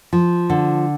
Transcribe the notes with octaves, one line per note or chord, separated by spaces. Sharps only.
F3
D3